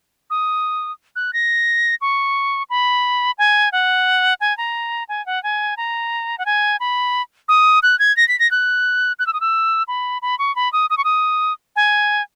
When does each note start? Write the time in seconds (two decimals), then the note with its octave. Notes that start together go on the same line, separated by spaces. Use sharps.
0.30 D#6
1.16 F#6
1.33 A#6
2.01 C#6
2.70 B5
3.38 G#5
3.72 F#5
4.41 G#5
4.58 A#5
5.09 G#5
5.26 F#5
5.43 G#5
5.77 A#5
6.38 F#5
6.46 G#5
6.80 B5
7.49 D#6
7.83 F#6
7.99 G#6
8.17 A#6
8.28 B6
8.40 A#6
8.51 F#6
9.19 F#6
9.27 E6
9.33 D#6
9.41 E6
9.88 B5
10.22 B5
10.39 C#6
10.56 B5
10.73 D#6
10.90 D#6
10.98 C#6
11.04 D#6
11.76 G#5